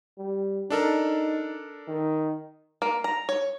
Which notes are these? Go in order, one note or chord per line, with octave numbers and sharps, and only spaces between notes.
G3
D4 D#4 A4 A#4
D#3
A#3
A#5
C#5